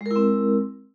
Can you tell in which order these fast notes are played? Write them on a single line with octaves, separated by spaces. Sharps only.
G#3 A#4 E4 C4